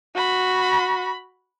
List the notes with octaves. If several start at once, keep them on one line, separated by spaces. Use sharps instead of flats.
F#4 B5